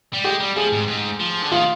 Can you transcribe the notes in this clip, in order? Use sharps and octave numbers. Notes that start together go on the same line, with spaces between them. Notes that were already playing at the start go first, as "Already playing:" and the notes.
G3
G#3 G4
G3
F3 G#4
G#2
G#2
F3
D3
D#3 F4